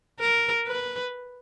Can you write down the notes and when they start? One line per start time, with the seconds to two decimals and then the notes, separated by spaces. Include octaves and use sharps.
0.20 A#4
0.67 B4